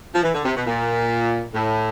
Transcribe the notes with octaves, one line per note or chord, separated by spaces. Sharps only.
F3
E3
D3
C3
B2
A#2
A2